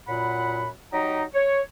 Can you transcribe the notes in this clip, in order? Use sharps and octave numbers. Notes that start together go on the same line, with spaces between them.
F#2 A#2 F#5 B5
F#3 D#4 G4 D#5 A#5
C#5